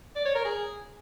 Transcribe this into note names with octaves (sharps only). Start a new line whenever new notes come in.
D5
C#5
A#4
G#4